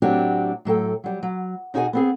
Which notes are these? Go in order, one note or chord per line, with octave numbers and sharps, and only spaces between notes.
A2 F#3 C4 D4 F#4 G4
A2 F#3 A4 G5
F#3 G3
F#3
B2 D#4 F#4 G#4 D5 G#5
B3 C4 G#4